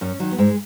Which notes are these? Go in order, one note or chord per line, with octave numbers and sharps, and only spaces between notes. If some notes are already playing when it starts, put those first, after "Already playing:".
F#2 C#4
D#3 F#3
B3
G#2 G#3